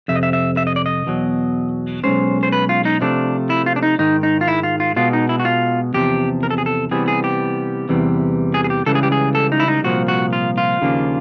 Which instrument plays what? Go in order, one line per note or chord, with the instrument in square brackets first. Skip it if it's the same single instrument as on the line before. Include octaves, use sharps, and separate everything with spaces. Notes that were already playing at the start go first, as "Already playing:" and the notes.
[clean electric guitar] F2 C3 E5
D#5
E5
E5
E5
D#5
D5
D#5
E2 B2 F#3
B1 B2 G#3 C#4 C5
C5
B4
F4
D#4
C3 F3 A3 D4
E4
F4
D4
D#4
G#2 D#3 G#3 D#4
D#4
F4
E4
F4
F4
B2 G#3 B3 F4
D#4
E4
F#4
F4
E2 C3 F3 G4
A#4
A4
G#4
A4
C3 E3 G3 B3 G#4
G#4
G4
E2 C3 E3 G3
G#4
G#4
G4
C#2 C#3 E3 G3 A4
G#4
G4
G#4
A4
D#4
E4
D#4
C2 A#2 F3 F#4
F#4
F4
F4
D#2 C#3 F3 A#3 D4